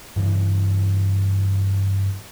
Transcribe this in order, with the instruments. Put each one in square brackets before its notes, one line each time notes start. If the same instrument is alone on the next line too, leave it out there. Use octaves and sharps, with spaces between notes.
[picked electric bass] G2 C#3 E3